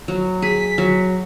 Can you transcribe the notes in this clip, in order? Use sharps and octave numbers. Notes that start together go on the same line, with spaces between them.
F#3
G#4 B6
F#3